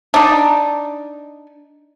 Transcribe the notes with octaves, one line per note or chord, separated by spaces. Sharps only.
D4 D#4